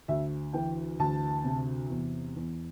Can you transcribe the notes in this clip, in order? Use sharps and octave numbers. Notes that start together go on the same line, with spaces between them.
D2 E5
E3 G5
D2 A5
C3
E2
E2